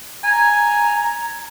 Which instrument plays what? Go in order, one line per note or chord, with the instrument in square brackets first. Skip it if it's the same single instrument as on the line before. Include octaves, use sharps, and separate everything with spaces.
[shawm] G#5 [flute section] A#5